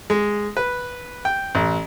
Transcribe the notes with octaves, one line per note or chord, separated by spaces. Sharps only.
G#3
B4
G5
A1